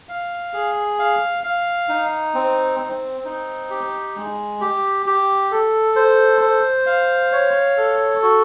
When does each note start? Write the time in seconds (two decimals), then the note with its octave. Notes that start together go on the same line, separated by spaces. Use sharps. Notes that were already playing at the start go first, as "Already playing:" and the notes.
0.09 F5
0.54 G#4
0.99 F5
1.44 F5
1.89 D#4
2.34 C4
2.80 C4
3.25 D#4
3.70 G4
4.16 G#3
4.61 G4
5.06 G4
5.51 A4
5.96 C5
6.41 C5
6.86 F5
7.32 C#5
7.77 A4
8.22 F#4